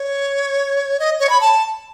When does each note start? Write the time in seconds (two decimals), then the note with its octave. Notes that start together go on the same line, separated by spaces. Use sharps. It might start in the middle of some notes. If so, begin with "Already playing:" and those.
Already playing: C#5
0.99 D#5
1.20 C#5
1.29 B5
1.41 A5